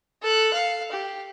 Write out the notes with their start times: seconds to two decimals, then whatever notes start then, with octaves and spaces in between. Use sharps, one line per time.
0.23 A4 F#6
0.53 F5
0.92 G4